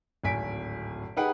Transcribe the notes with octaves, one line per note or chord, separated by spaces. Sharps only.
D1 G#1 G#5 B6 D7
D#4 G4 G#4 B4 F#5 G5